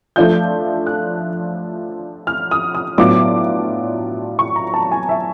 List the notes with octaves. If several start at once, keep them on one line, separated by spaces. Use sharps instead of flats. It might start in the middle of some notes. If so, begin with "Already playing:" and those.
F3 A3 D4 F4 G6
F#6
F6
D#6
D#6
A2 F#3 B3 D4 F4 D6
C#6
A#5
A5
G#5
E5